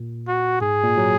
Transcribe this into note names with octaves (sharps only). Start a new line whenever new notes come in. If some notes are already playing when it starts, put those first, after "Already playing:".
Already playing: A#2
F#4
G#2 G#4
A#2
F#3